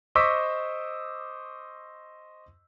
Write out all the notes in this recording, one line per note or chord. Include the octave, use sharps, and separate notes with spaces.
C5 D#5 C#6 D6 E6 B6